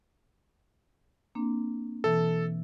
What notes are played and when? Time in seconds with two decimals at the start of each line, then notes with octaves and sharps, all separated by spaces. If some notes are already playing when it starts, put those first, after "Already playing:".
1.35 A#3 C4 D4
2.04 B2 E3 A4